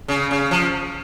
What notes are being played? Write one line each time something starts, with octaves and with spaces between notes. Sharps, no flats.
C#3
C#3
F3